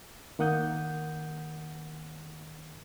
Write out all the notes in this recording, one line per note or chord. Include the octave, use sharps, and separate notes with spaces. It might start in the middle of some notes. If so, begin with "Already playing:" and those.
D#3 A#3 F#5 D#6 G6